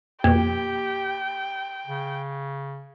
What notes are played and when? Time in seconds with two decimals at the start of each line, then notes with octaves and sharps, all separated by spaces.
0.24 F2 B2 A#3 G4 G5
1.87 C#3